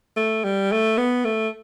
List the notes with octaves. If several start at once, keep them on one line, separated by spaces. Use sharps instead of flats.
A3
G3
A3
B3
A3